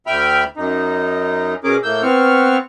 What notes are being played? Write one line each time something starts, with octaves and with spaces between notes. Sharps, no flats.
D2 E5 G5 B5 F6
F#2 D#4
B2 C#4 G#4 A#4 D6
A2 A#3 E6 G6
B3 C4 C#6 F6